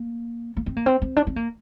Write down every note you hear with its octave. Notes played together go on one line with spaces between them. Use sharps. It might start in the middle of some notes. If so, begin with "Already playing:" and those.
Already playing: A#3
A#3
C4
A#3
C4
C4
D4
C4
A#3